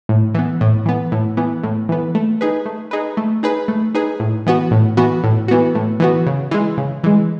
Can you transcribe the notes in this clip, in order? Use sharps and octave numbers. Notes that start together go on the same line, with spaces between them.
A2
E3 B3
A2
E3 B3
A2
E3 B3
A2
E3 B3
A3
D#4 G#4 B4
A3
D#4 G#4 B4
A3
D#4 G#4 B4
A3
D#4 G#4 B4
A2
E3 B3 F#4
A2
E3 B3 F#4
A2
E3 B3 F#4
A2
E3 B3 F#4
C#3
E3 G#3
C#3
E3 G#3